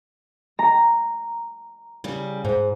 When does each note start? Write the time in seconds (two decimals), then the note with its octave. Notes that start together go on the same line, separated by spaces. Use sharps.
0.59 A#5
2.04 C#3 G3
2.45 G#2